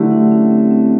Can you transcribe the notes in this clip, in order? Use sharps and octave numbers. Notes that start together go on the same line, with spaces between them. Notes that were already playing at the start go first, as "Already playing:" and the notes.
Already playing: D3 F#3 A3 E4 F#4 G4
D4
C#4
C4
C4